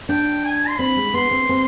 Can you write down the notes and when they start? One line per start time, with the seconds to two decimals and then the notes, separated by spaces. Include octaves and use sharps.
0.09 D4 G5
0.44 G#5
0.68 C6
0.79 C4 B5
0.96 G#3
1.14 B3 C6
1.31 C4
1.49 C4